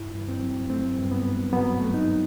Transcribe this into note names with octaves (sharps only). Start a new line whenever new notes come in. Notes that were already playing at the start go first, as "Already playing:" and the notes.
Already playing: G2 E4
G2
C4
F#3
A3 C4
G2
B3
G2
F#3 B3
A3
D#4